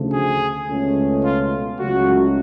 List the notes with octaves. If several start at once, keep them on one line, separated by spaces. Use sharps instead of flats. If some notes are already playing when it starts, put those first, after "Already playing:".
Already playing: D2 C#3 F3 A3
G#4
C#2 B2 A3 C#4
F4
C#2 C#3 F#3 A3 F#4